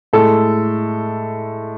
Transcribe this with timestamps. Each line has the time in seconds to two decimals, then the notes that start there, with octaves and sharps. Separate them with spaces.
0.13 A2 G#3 A4